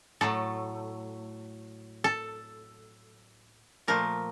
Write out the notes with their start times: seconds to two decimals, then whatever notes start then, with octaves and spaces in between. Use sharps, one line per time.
0.21 A2 F#3 A3 A4
2.04 A4
3.87 A#2 F3 A3 A#4